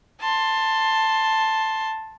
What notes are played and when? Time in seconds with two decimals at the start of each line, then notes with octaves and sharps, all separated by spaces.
0.20 A5 C6